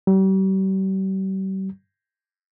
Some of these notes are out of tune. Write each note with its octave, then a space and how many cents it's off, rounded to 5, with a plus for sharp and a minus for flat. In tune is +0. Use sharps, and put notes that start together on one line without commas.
G3 -40